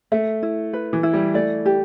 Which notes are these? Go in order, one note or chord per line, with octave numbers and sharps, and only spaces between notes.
A3 E5
E4
B4
E3
E4
G3
A3 D5
G4